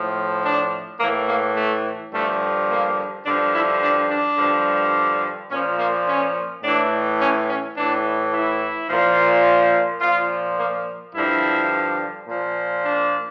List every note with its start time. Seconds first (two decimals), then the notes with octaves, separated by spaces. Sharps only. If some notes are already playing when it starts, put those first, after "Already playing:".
Already playing: A2 F3
0.43 D4
1.00 A2 E3 A#3
1.28 A#3
1.56 A3
2.13 G2 D3 F3 A3
2.69 A#3
3.25 G2 D3 F3 D4
3.53 E4
3.82 D4
4.10 D4
4.38 G2 D3 F3
5.51 A#2 F3 C#4
5.79 A#3
6.07 C#4
6.63 A2 E3 D4
7.21 C#4
7.48 C#4
7.76 A2 E3 D4
8.33 E4
8.89 A#2 F3
10.01 A#2 F3 F4
10.58 A#3
11.15 G2 D3 F3 E4
12.27 A#2 F3
12.84 D4